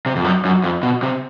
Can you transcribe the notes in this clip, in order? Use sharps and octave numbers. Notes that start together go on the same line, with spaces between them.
C3
F2
F#2
F#2
F2
B2
C3